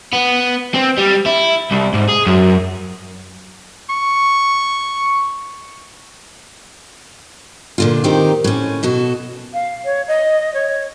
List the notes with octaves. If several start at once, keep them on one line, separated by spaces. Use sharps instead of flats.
B3
C4
G3
E4
C2
G#2
G#4
F#2
C#6
A#2 D3 F4
D#3 C4 D#4 G4 A#4
A2 C#4
B2 F#4 A4
F5
C#5
D#5
C#5